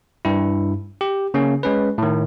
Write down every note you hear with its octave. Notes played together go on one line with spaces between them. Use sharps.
G2 E4
G4
C#3 A#3 C#4
G#3 C#4 B4
A2 D#3